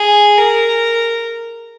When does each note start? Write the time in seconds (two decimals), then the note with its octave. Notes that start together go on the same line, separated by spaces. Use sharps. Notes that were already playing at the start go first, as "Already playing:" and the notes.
Already playing: G#4
0.37 A#4